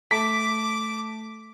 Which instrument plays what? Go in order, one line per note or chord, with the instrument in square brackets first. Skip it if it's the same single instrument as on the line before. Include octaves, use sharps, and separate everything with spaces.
[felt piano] A3 A5 [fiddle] D6 [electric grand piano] B6